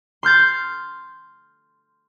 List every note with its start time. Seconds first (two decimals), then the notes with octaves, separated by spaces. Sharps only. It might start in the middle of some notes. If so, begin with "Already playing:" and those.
0.23 C6 F6 G6 A6